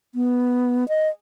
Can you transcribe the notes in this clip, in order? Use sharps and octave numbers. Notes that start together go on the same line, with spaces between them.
B3
D#5